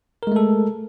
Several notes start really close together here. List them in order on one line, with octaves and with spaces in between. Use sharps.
A#4 G#3 A3 A4